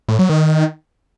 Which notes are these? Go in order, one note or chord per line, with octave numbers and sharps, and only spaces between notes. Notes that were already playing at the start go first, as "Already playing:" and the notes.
A2
F#3
D#3